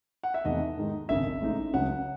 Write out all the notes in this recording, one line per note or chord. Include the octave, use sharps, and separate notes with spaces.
F#5
E5
E2 C3 D#3 A3 D#4 D#5
G#2 D#3 G#3 D#4
G#1 F#2 C#3 E5
A1 A2 G#3 D#4
C#2 C#3 F#3 C#4 F#5